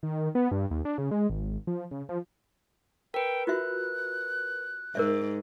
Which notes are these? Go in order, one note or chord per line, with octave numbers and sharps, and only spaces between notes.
D#3
B3
G2
D#2
D4
C#3
G#3
G#1
F3
C#3
F3
A#4 B4 G5
F4 F#4 E5 F#6
G#2 A#4 D5 E5